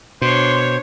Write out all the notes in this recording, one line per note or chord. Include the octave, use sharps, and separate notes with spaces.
B2 D4 C5 C#5 C6